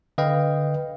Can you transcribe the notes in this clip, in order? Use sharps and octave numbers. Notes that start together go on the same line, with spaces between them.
D3 B4 D#5 F5 G5